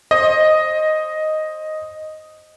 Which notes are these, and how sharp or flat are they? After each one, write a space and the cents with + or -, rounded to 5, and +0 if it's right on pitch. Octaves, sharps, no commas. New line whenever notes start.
C5 +25 D#5 +0